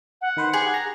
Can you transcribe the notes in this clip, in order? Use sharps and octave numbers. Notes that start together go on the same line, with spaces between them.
F#5
D#3 B4 C5
G4 G#4
A#5